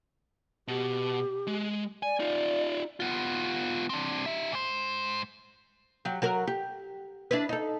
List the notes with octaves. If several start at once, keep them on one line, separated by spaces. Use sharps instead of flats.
B2 G4
G#3
D5 G#5
D#4 F4
B3 F4
C4 D4
D#4 E5
G#2 C5
F#3 G4
F#3 F#4 A#4
G4
D4 E4 B4
D#4 A4